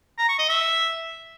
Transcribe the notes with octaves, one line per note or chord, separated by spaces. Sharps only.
A#5
C#6
D#5
E5